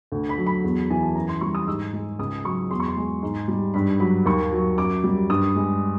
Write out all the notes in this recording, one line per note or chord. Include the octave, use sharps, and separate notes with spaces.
D2
B5
F#3
B5
E2
E3 G#5
A5
F#2 A#5
C6
G3 C#6
D#6
G#2 E6
G#3
C#2 D#6
F#3 C#6
E2 C6
C#6
C6
G#3
G#2
G3
G2 B5
F#3 B5
D#2 C#6
F#3
F#2 D6
G3
G2 D#6
G#3